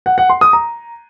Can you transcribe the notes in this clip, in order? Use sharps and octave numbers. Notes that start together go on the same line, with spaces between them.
F#5
F#5
C6
D#6
A#5